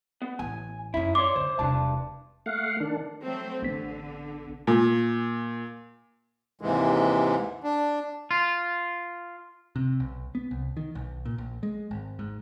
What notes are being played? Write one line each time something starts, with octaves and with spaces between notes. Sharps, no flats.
B3
A1 G#5
F#2 C#4 D#4 E4
C#5 D5 C6 D6
D3 C5
E1 G2 C3 D4 A5
A3 F5 F#5
D#3 D4
F#3 A3 C4
A1 D3 B3 B6
A#2
D#2 G#2 C3 E3 G#3
D4
F4
C3
B1
B3
C2
D#3
B1
A#2
A#1
G#3
G#1
G#2